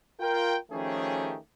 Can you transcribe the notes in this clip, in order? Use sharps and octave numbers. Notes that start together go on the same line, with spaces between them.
F4 A#4 G5
D#3 F3 A3 C#4 G4 G#4